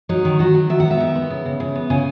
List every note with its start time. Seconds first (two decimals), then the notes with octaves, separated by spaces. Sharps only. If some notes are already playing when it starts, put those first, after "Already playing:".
0.09 F#3 D#4
0.25 D#3
0.39 D#3 F#4
0.54 F#3
0.70 D#3 E5
0.80 B3 F#5
0.91 E5
1.00 D#3
1.15 B3
1.30 C#3
1.45 C#3
1.60 C#3
1.75 B3
1.90 C#3 G#5